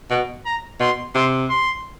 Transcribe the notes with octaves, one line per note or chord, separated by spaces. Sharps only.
B2
A#5
B2 C6
C3 C6
C6